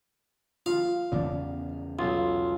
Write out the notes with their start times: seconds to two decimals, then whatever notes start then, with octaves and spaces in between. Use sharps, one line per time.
0.66 F4 F5
1.12 E2 C#3 B3 D5
1.99 B1 F4